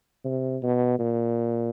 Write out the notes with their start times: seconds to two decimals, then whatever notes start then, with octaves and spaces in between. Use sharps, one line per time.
0.24 C3
0.62 B2
0.99 A#2